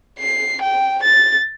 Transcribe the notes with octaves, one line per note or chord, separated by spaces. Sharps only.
C7
G5
A6